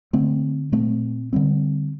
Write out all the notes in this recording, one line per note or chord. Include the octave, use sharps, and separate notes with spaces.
D3 A3 C4
A#2 A3 C4
D3 G3 C4